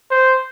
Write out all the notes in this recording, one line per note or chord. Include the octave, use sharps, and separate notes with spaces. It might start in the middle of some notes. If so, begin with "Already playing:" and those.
C5